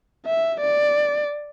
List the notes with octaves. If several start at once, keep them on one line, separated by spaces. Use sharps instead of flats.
E5
D5